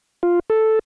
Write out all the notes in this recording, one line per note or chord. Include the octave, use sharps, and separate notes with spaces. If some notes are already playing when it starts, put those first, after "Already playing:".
F4
A4